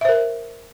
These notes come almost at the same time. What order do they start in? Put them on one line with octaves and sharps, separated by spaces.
E5 C5 A#4